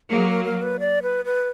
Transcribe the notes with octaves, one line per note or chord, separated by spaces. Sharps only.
F#3 A#3 G#4
A#4
A#4
B4
D5
B4
B4